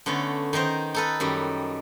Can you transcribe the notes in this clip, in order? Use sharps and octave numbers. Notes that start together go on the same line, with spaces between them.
D3 A3 B3 C#4
D#3 D#4 A#4 C5
D#4 A4 B4
F#2 D#3 G3